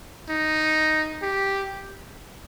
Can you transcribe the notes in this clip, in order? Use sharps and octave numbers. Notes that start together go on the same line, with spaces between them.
D#4
G4